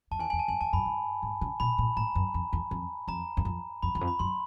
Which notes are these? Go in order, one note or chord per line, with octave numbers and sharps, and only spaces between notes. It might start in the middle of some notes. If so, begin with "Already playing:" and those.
F2 A5
E2 G#5
G#5
E2
A5
F2 G#5
E2 A5
F#2 B5
G2
G#2
C#3
B2 B5
A#2
A2 A#5
F#2
F2
E2
F2
F2 A#5
E2
F2
F2 B5
E2
F2
B5
F#2 C6